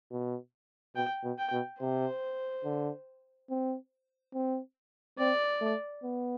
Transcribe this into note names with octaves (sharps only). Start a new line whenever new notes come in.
B2
B2 G5
B2
G5
B2
C3 C5
D3
C4
C4
C4 D5
A3
B3